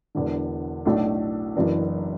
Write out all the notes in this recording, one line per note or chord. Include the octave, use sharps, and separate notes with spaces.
E1 E2 D3
B1 A2 A3 D4
F#1 F#2 E3 D4